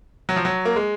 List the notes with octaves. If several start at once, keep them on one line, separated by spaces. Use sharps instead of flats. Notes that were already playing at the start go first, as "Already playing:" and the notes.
F#3
F3
F#3
A#3
G#3